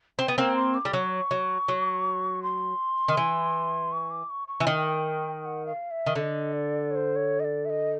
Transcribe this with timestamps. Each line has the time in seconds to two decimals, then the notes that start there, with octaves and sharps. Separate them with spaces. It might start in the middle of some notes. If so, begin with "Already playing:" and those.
0.19 C4 G5
0.28 B3
0.38 A#3 C4 G5
0.56 C6
0.75 D6
0.85 G3
0.93 F#3 C#6
1.31 F#3
1.68 F#3
2.43 C6
3.08 D#3
3.17 E3
3.92 C#6
4.11 D6
4.30 C#6
4.48 C#6
4.60 E3
4.66 D#3 G5
5.41 G5
5.45 F#5
5.66 F5
5.91 E5
6.06 D#3
6.15 D3 D#5 E5
6.53 D5
6.91 C#5
6.95 C5
7.16 C#5
7.40 D#5
7.45 D5
7.65 E5
7.70 D#5